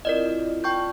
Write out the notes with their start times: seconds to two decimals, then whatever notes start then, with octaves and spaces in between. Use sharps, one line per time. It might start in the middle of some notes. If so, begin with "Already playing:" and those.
0.05 C4 E4 F4 A#4 D5 D#5
0.64 F4 D5 G5 A5 C#6 G6